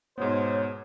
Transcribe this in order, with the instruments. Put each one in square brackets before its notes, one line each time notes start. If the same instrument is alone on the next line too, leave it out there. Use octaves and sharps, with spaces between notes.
[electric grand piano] G#2 B2 B3 [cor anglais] C5 [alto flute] C#5